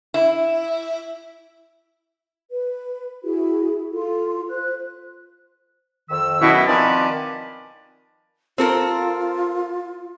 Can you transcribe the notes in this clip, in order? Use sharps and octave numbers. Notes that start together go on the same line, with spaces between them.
E4
B4
E4 F#4 G#4
F4 A4
C5 F#6
F2 D#3 E6
F#2 B2 E4
D#3 F3 C4 B4 D5 G#5
C4 F4 A4 A#4